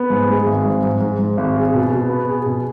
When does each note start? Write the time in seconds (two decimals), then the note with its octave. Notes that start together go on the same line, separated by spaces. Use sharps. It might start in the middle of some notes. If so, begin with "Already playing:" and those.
Already playing: B3
0.10 G#2
0.29 G#3
0.46 G#1
0.65 G#2
0.84 G#2
1.00 G#2
1.19 G#2
1.37 G#1
1.56 G#4
1.74 B2
1.92 B2
2.09 B3
2.28 G#4
2.46 B2